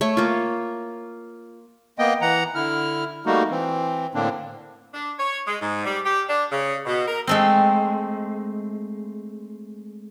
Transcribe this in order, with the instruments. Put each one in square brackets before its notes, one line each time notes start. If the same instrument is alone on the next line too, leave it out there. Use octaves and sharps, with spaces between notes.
[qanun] A3 C#5
A#3 F4
[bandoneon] A#3 B3 D#5 G5
E3 F#5 A#5
D3 E4 F6
G3 A3 A#3 D#4 F#4
E3 C4
A2 D3 A#3 C4 D4
[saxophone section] D4
C#5
G#3
G#2
G3
G4
D4
C#3
B2
A#4
[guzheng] G#3 A3 C4